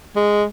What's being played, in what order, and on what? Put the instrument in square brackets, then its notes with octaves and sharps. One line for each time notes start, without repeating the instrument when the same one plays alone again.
[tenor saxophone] G#3